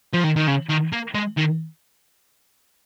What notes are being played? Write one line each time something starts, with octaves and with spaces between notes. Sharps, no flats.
F3
D#3
D#3
C#3
D#3
A#3
G#3
D#3